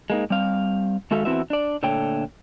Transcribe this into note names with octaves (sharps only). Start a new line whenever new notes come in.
G#3 A#3 D#4
G3 C4 F5
D#3 G#3 F#4 A4 E5 F5
E2 C4 E4 F#4 B4 E5
D4 D5
A#2 D3 A3 C#5 G5